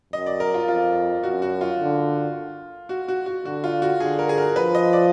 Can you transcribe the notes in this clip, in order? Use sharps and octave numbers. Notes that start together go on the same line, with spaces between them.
F#2 D#5
D5
A#4
F4
F2 F4
F#2 F#4
F#4
F4
D3
F#4
F#4
F#4
D3 F#4
F4
F#4
D3 G#4
A#4
G#4
A#4
F3 B4
D#5
D5